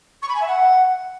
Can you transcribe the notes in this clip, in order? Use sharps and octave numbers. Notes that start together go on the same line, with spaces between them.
C#6
B5
G#5
E5
F#5